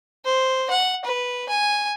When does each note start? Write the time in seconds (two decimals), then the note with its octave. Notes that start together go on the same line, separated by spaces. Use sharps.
0.25 C5
0.70 F#5
1.05 B4
1.49 G#5